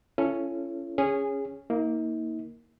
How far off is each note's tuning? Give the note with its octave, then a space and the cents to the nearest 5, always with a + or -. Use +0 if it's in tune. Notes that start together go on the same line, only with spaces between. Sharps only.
C#4 +0 E4 +45 A4 +0
C#4 +0 G#4 -15
A#3 +0 D#4 +40